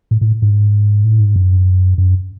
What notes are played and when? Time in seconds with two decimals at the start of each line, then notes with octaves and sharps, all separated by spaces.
0.11 A2
0.21 A2
0.42 G#2
1.04 A2
1.20 G#2
1.36 F#2
1.98 F#2